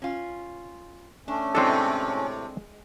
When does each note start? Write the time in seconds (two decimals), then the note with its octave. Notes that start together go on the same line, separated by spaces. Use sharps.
0.02 C#4 F4
1.28 A3 C#4 D4
1.55 A2 C3 G#3 C4 D4 A4